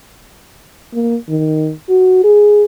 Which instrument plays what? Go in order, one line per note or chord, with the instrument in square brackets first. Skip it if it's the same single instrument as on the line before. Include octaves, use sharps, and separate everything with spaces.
[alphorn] A#3
D#3
F#4
G#4